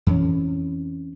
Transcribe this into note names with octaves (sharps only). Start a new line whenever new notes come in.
F2 E3 C#4